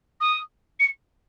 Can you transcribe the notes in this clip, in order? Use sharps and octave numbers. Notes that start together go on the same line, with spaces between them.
D#6
C#7